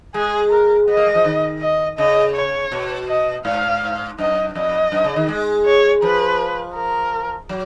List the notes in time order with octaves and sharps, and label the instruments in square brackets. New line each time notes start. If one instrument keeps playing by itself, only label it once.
[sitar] G#3 [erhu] G#4
[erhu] A#4
[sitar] B3 [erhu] D#5
[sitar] A#3
G#3
F3
D#3
[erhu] D#5
[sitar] C#3 [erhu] D#5
[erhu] C#5
[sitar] B2
[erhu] D#5
[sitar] G#2 [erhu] F5
[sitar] F#2 [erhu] D#5
[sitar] F2 [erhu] D#5
[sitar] F#2
C#3
D#3
G#3
[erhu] C#5
[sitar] F3 [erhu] B4
[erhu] A#4
[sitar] F#3